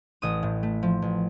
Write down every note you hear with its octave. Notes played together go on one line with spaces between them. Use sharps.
A1 D#6
A2
A3
F3
A1